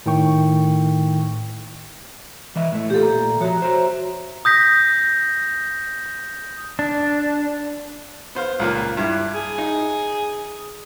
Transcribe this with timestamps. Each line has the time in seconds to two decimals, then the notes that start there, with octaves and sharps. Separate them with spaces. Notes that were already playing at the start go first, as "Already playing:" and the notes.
0.06 A2 D#3 G5 C#6
2.56 E3 D#5 E5
2.72 A2 A3
2.90 A#2 F4 G4 A4
3.03 A#2 A#5
3.40 F3 F#4 C#5 E5 A#5
3.62 C5 A#5
4.45 D#6 G6 A#6 B6
6.79 D4
8.35 B3 C5 F5
8.59 C#2 A#2 A#3
8.97 G2 E4
9.35 G#4
9.58 D#4